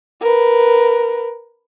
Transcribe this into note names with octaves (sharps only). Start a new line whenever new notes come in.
A#4 B4